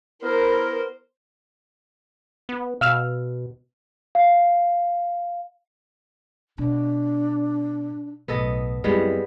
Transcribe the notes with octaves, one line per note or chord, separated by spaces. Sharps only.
B3 E4 A#4 C5
B3
B2 F5 E6 F6
F5
B2 D4
B1 A2 B3 A4 D#5
F#2 G3 G#3 B3 C4 E4